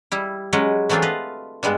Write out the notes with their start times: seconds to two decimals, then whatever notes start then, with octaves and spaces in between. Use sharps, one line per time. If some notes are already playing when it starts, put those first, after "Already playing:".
0.12 G3 E4
0.53 F#3 G#3 C#4 B4 D#5
0.89 E3 F#3 A3 C4 D4 F4
1.02 B4 D#5 F5
1.63 G2 G3 G#3 B3